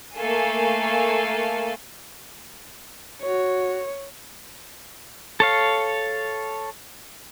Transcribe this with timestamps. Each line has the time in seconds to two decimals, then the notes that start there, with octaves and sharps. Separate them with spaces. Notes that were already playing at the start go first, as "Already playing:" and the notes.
0.16 A3 A#3 A4 F5 G#5
3.22 F#4 C#5
5.40 A4 C#5 F5